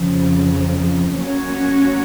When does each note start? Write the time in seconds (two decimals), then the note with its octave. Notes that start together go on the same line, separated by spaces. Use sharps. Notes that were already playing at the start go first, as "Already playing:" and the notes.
Already playing: F2 C#3 F3
1.17 F#3 A#3 C#4 F#4 C#5